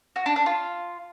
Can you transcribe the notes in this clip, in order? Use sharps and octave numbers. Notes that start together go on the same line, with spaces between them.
F#4
D4
D4
F4